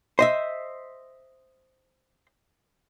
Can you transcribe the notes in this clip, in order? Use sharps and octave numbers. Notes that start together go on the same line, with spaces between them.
C5 D#5 E5